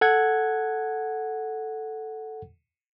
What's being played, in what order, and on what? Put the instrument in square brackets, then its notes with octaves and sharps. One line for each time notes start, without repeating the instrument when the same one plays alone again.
[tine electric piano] A4 F#5 G#6